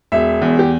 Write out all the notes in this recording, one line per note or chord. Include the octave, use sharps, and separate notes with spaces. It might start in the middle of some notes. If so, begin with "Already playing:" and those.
E1 E5
E2
G4